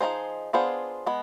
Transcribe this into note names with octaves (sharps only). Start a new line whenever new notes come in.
F3 C4 D#4 G#4 C5
B3 D4 F4 G#4 C5
G#3 B3